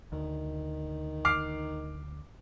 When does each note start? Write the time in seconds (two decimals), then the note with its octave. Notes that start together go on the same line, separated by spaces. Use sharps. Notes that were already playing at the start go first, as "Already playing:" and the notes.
0.12 D2 D#3
1.25 D6 F6 C7